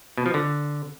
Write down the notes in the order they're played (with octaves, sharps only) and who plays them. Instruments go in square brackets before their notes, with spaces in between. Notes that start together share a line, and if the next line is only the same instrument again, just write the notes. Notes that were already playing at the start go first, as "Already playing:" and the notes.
[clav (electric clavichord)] B2
F3
D3